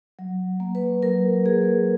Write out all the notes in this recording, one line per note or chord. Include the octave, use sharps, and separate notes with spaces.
F#3
A#3
B4
F#3 A#4
A#3 G#4